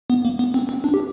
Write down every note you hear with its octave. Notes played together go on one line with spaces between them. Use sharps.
B3
A#3
B3
C4
C4
D4
G4